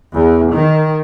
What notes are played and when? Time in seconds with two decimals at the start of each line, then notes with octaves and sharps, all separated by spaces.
0.14 E2
0.52 D#3